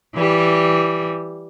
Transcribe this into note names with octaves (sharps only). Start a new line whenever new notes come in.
E3 G3